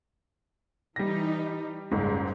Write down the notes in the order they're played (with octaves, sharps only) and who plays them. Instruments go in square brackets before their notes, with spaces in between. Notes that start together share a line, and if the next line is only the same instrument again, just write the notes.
[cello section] E3 D#4 [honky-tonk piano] G3 A#6
[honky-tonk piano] F#1 C#2 G#2 [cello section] G3